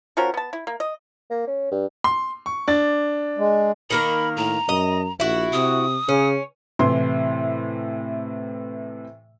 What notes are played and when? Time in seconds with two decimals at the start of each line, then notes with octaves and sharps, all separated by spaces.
0.17 F3 C#4 F#4 A#4
0.34 B3 A5
0.53 E4
0.67 A#3
0.80 D#5
1.31 A#3
1.48 C#4
1.72 G2
2.04 C6
2.46 C#6
2.68 D4 A6
3.38 G#3
3.90 D#3 A#3 A#4 B5
4.37 A2 A#5
4.69 F#2 D#5
5.20 A#1 E4 F#4
5.53 C3 D#6
6.09 C#3 C#4
6.79 A2 C3 E3 E4 C6